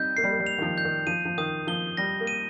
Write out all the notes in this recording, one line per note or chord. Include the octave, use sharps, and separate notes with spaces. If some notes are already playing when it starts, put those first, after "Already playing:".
Already playing: G3 C4 D#4 G6
A#3 C7
G3
A#3
G3
F7
D#3
F3
G6
D#3
F3 D#7
F3
D#3 D#6
F3 G7
G3 A#6
A#3
D#7